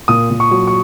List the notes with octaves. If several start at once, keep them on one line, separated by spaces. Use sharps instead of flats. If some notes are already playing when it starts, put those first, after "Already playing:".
A#2 D#6
A#2
C#6
F#3
C#6